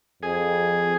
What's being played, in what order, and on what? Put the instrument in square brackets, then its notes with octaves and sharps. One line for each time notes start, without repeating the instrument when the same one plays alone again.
[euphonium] F2 [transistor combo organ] G#4